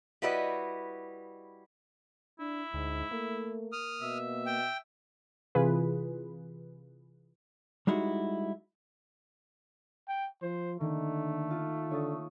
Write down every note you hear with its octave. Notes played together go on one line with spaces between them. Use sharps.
G3 E4 F#4 B4 D5 D#5
D4 E4
D2 G#2
A3 A#3
D#6 F6
B2 E5
G5
C3 E3 F4 G#4 B4
G3 G#3 D#4 E4 F#4
G5
F3 C5
D3 D#3 A3 A#3
F4
D3 C#5 D#6 A6